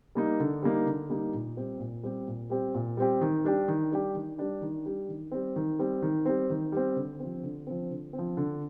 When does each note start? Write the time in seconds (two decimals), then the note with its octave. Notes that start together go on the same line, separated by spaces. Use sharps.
0.15 G3 A#3 D#4
0.40 D3
0.62 G3 A#3 D#4
0.86 D3
1.09 G3 A#3 D#4
1.34 A#2
1.57 G3 C4 G4
1.80 A#2
2.03 G3 C4 G4
2.28 A#2
2.50 G3 C4 G4
2.75 A#2
2.97 G3 C4 G4
3.21 D#3
3.44 G3 D4 G4
3.68 D#3
3.92 G3 D4 G4
4.15 D#3
4.38 G3 D4 G4
4.61 D#3
4.86 G3 D4 G4
5.09 D#3
5.32 G3 C4
5.56 D#3
5.79 G3 C4
6.02 D#3
6.25 G3 C4
6.50 D#3
6.72 G3 C4
6.96 D3
7.20 F3 C4
7.43 D3
7.67 F3 C4
7.90 D3
8.13 C4
8.19 F3
8.37 D3